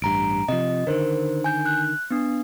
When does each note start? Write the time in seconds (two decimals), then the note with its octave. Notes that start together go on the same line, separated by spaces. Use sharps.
0.02 A1 G2 A#5 D7
0.48 C3 F3 D#5
0.87 D3 D#3 A#4 C5
1.44 G#5 G6
1.66 F#6
2.11 B3 D4